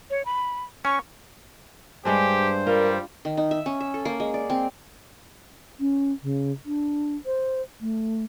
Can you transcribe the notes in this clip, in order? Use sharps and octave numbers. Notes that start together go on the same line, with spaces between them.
C#5
B5
C#4 C#6
G2 G3 G#3 D4 G4 C5
G3 F4 A#4
D#3
D#4
E5
C#4
E5
A4
A#3
G#3
D5
C4
C#4
C#3
D4
C5
A3